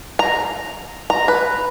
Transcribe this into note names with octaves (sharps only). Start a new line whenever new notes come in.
A#5
A#5
B4